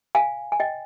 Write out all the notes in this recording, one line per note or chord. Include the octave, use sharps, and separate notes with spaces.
F5 G#5
G#5
D#5 G5